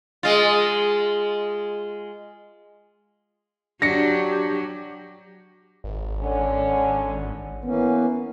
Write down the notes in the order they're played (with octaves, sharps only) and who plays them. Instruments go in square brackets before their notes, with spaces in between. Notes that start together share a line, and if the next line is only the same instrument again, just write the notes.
[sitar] G#3 F4
[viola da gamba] F#3 [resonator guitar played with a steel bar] D4 [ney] G4 [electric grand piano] A#6 C#7
[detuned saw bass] G#1
[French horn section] D3 C#4
[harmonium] E3 A#3 C#4 [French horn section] B3